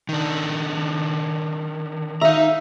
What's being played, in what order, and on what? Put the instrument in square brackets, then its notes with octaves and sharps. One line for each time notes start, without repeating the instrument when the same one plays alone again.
[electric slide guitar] D#3 D4
[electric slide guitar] D#4 A#5 [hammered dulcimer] E5 F5